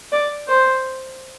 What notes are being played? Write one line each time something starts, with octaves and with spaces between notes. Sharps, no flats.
D5
C5